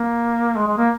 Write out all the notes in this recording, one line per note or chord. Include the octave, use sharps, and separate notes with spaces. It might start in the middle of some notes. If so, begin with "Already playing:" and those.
Already playing: A#3
G#3
G#3
A#3